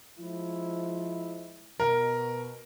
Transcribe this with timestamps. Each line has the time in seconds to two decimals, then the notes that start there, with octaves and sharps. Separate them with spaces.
0.19 F3 G#3 E4
1.80 B2 A#4